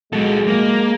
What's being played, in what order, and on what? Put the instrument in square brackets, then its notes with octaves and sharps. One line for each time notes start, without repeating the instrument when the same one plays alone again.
[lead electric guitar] F#3 A4 [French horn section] G#3
[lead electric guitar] A#3